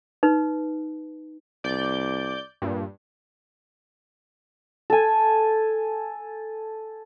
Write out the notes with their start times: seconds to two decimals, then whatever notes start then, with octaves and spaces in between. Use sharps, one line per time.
0.23 D#4 B4
1.64 C2 D5 G6
2.62 G2 A#2
4.90 A4 G#5